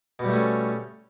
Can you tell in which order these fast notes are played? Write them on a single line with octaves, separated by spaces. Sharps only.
B2 G3 A3 C#4